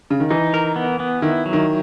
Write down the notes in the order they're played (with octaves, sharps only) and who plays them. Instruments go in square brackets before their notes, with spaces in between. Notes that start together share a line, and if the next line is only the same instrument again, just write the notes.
[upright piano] C#3
D#3
[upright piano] E3 [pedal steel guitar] D#4
[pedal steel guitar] A#4
B3
B3
[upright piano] D#3 [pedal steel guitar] E4
[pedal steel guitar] F#3
[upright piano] D#3